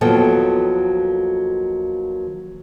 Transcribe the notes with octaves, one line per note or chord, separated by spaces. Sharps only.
D#2 F3 F#3 B3 A4 G5